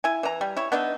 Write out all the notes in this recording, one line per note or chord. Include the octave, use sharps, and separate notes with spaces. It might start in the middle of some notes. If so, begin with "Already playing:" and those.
E4 G#5
E3 A#5
G3
E4 C#5
B3 D4 D#4 E5